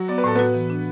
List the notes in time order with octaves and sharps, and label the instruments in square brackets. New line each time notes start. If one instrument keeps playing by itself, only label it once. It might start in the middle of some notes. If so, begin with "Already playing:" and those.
Already playing: [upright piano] F#3 F#4
[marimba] B3 [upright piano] D5
[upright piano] B4
[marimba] A2 [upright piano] A4
[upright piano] B3 B4 [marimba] F#4
[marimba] E3
D4